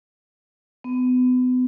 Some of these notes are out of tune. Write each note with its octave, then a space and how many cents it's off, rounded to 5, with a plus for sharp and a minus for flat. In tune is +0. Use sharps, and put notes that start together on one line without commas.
B3 +35